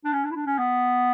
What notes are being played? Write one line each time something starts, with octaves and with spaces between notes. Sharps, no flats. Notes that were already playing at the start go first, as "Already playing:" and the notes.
D4
C#4
D4
E4
D4
C#4
B3